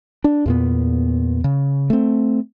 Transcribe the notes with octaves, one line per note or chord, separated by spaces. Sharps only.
D4
E2 A#2 B3
C#3
A3 C4